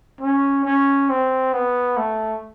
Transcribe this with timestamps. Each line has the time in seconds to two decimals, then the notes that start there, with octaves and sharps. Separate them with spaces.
0.21 C#4
0.65 C#4
1.09 C4
1.53 B3
1.97 A3